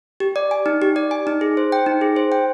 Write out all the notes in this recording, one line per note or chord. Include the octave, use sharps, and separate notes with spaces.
G4
D5
G#5
D#4
G4
D5
G#5
D#4
G#4
C5
G5
D#4
G#4
C5
G5